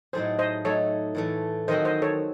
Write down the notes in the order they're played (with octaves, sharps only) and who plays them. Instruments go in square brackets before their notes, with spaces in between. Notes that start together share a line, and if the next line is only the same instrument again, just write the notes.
[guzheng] A2 F#3 A3 D#4 G#4 [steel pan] C5
[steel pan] C5 D#5
[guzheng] F#3 A3 D#4 [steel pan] A4 C#5
[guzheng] A2 E3 A3
[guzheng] D#3 F#3 C4 F#4 [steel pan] C5 D#5
[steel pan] C5 D#5
A4 C#5